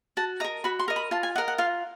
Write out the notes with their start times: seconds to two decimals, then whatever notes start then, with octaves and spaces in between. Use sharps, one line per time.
0.17 F#4 A5
0.40 A#4 D#5 A#5
0.64 F#4 B5
0.79 C6
0.88 A#4 D#5
0.96 B5
1.11 F4 A5
1.23 G#5
1.35 A#4 D#5 F#5
1.48 F#5
1.58 F4 F5